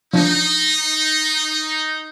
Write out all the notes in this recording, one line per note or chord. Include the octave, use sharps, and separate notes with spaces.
F3 D4 D#4